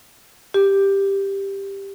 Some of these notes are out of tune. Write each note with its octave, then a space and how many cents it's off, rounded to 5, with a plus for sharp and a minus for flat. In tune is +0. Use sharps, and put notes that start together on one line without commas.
G4 +5